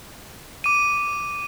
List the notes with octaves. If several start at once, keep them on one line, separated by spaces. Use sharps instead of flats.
D6 D#7